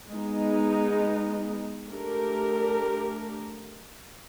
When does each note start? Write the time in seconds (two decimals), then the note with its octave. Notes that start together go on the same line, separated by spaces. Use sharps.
0.10 G#3 B3 D#4
1.89 A3 D4 G4 A#4